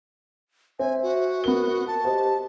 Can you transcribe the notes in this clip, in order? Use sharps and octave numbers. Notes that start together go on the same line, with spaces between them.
C4 E5 G#5
F#4
B3 A#4 G7
A5
G4 C5 D#5